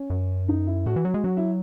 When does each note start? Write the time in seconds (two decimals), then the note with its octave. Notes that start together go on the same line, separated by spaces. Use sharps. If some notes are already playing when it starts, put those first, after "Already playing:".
Already playing: C#4
0.10 F#2
0.48 D#4
0.67 E4
0.86 A2 F#4
0.96 E3
1.05 F#3 F#4
1.14 G#3
1.24 F#3 F#4
1.37 E4